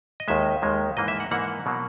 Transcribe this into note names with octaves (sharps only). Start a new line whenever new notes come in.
D#5
D#2 D#3 G#3 E5
D#2 D#3 G#3
G#2 E3 A#3 D#5
E5
F#5
G#2 E3 A#3 F#5
B2 F#3 A#3